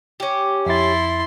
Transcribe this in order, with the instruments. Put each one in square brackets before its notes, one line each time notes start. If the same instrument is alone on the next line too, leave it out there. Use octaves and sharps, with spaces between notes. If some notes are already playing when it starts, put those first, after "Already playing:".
[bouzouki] C#4 G4
[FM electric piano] F2 A6 [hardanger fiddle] E4 C6